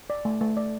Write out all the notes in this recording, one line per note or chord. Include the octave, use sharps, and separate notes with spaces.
D5
A3
A3
D5